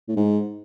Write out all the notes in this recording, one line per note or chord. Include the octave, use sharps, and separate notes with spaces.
A2
G#2